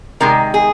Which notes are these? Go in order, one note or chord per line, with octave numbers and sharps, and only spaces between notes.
C3 D#3 G#3 A#4
G#4